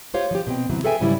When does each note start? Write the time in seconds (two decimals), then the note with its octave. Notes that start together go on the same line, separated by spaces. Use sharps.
0.14 G#3 F4 G4 C5 C#5 F5
0.31 F3 G4
0.47 B2 C4 G5
0.70 D#2 C3 E3 F#3
0.84 G#4 A4 B4 E5 G5 G#5
1.00 G#2 C#3 E3 F#3 G3 E4